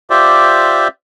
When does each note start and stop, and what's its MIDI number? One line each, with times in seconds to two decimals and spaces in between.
0.10 0.88 65
0.10 0.88 67
0.10 0.88 72
0.10 0.88 74
0.10 0.88 76